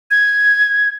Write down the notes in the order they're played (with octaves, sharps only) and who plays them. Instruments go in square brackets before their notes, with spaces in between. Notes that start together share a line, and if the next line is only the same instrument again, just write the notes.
[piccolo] G#6